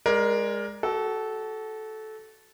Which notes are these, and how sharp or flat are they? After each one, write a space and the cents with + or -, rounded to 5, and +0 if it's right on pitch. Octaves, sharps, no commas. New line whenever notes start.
G#3 -10 A#4 +15 D5 +0
F#4 +30 A4 -15